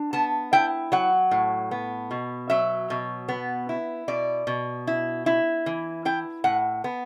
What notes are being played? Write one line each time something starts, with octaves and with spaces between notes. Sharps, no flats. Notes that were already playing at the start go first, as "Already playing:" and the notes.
Already playing: D4
B3 A5
E4 G5
F#3 F#5
A2
B3
B2
F#3 E5
B2
B3
E4
B2 D5
B2
E4
E4
E3
E4 G5
A2 F#5
B3